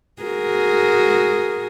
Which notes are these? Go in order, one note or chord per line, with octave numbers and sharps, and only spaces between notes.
F#4 G#4 A#4